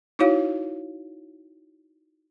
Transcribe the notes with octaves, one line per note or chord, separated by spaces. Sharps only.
D#4 E4 F#4 C#5 F5